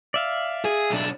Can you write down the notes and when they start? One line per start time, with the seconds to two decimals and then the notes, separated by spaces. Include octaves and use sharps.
0.14 D5 E5 F5
0.65 G#4
0.90 B1 D4